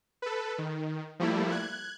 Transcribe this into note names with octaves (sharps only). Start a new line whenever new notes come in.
A4 B4
D#3
F3 G3 A3 A#3 E4
F#6 G#6